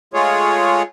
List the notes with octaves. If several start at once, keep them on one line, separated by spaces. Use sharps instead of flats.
G#3 A3 F4 G#4 C#5